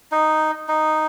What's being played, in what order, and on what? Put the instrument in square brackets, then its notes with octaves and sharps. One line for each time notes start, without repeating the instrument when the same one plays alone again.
[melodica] D#4
D#4